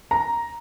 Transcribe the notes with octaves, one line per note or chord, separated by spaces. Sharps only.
A#5